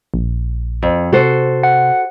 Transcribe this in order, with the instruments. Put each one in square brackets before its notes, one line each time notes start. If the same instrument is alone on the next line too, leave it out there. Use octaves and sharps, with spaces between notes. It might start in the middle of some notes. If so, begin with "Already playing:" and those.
[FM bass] A#1
[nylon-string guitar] F2
[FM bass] C3 [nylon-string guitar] F#4 A4 C5
[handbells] F#5